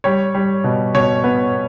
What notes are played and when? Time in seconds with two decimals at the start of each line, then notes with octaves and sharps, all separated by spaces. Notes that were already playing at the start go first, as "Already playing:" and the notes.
0.04 G3 C#5
0.35 G3
0.64 B2
0.95 B2 C#5
1.24 B3